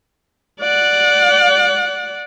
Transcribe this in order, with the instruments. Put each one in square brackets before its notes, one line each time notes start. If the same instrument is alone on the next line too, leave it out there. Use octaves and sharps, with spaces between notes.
[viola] D5 F#5